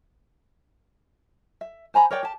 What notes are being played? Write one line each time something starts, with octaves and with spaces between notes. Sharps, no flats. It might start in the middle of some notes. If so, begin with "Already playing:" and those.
E5
C5 G#5 A#5 B5
A#4 C#5 D5 G5
G4 A5